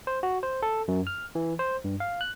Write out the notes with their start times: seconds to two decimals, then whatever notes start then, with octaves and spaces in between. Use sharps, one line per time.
0.07 C5
0.23 F#4
0.43 C5
0.63 A4
0.88 F#2
1.07 F6
1.35 E3
1.59 C5
1.84 G2
2.00 F5
2.21 F#6